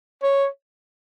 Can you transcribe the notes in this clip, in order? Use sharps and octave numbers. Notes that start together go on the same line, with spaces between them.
C#5